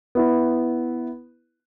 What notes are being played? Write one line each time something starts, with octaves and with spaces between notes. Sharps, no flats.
B3 E4